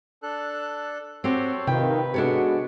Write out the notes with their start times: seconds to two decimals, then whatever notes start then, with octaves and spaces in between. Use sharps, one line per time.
0.23 D4 A4 F#6
1.24 C4 F#4 G4 A4 C5 C#5
1.67 C3 D#3 F4 B4 G5
2.14 G#3 B3 D4 F#4 A4 C#5